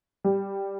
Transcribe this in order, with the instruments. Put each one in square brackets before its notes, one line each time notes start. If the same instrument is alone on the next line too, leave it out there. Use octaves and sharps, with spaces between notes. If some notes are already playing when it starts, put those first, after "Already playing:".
[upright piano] G3